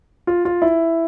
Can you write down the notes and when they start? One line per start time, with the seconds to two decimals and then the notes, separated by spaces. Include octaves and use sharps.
0.27 F4
0.45 F4
0.62 E4